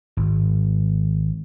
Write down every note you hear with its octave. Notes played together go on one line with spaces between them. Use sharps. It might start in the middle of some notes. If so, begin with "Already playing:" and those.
G#1 G#2